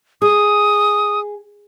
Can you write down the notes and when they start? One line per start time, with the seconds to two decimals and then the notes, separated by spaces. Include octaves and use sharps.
0.22 G#4 D#6